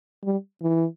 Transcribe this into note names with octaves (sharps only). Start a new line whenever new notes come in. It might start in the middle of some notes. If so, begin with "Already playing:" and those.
G3
E3